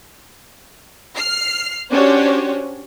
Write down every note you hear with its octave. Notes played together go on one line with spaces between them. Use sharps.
F6 C7
C#4 D4 F#4 G4 C5 C#5